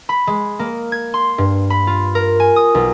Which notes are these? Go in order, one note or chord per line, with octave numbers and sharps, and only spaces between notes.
B5
G#3
A#3
G#6
C6
G2
B5
F4
A#4
G#5
D#6
B1